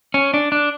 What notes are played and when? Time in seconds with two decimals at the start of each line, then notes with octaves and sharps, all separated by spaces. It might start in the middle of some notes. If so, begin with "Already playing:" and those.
0.14 C#4
0.34 D4
0.52 D4